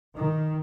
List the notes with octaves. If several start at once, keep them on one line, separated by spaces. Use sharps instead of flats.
D#3